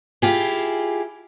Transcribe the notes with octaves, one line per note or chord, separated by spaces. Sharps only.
E4 F4 G4 G#4